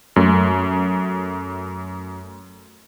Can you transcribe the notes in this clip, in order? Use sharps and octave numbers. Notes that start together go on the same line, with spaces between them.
F#2 A3